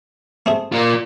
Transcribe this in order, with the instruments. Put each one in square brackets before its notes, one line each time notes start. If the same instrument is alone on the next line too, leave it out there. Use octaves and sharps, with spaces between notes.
[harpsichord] A3 C4 G#4
[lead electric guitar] A#3 F4